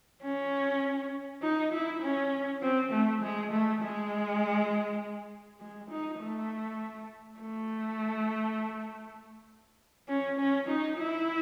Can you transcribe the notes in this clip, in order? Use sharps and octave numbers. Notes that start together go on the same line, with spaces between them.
C#4
D#4
E4
C#4
C4
A3
G#3
A3
G#3
G#3
D#4
A3
A3
C#4
C#4
D#4
E4